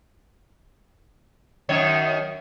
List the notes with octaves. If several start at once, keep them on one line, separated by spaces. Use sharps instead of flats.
F#2 D#3 C#5